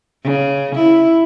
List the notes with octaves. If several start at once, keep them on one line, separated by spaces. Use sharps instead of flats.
C#3
E4